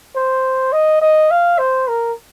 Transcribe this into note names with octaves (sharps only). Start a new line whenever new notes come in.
C5
D#5
D#5
F5
C5
A#4